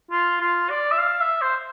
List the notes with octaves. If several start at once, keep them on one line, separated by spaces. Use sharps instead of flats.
F4
F4
D5
E5
F5
E5
C5